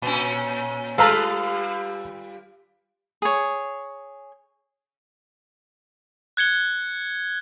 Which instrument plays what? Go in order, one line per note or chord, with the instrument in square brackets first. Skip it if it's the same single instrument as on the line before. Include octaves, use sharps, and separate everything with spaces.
[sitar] A#2 C#4
[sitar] G3 F4 B4 [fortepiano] A4 F5 A#5
[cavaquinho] G#4 C#5
[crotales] F#6 G#6 C#7 G7